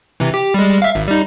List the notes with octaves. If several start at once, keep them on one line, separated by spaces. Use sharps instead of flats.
C3 E3
G4
G3 G#3
E5 F5
G#1
G3 D#4